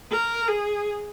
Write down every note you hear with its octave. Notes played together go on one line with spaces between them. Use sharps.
A#4
G#4